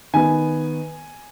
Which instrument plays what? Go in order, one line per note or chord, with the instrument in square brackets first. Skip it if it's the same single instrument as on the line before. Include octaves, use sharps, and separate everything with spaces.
[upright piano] D#3 B3 G#5